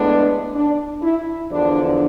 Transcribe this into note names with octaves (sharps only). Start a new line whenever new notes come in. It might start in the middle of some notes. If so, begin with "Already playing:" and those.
Already playing: A2 G#3 B3 D4
D4
E4
E2 D3 F3 D4